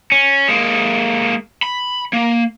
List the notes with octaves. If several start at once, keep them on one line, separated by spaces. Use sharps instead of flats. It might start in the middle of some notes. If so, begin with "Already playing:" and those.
C#4
G#3 A#3
B5
A#3